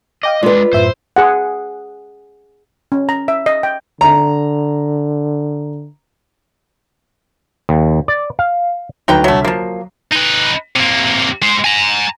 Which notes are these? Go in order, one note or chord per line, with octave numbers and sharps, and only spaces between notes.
D#5 F5 G5 D6
G#3 D4 F4 B4 D5
F#2 A2 C5 E5
G#4 F#5
C#4
A#5
E5
D#5
G5
D3 A#5
D#2
D5
F5
D2 F#3 D#4 B4 G5 A#5
C2 D3 F#3 A3 E5
F3 F#3 A#3
D#4 B4
C3 A#3
G#3 C5
G#5 A#5